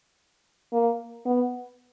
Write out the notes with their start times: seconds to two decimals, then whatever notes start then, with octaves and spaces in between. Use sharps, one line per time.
0.73 A#3
1.26 B3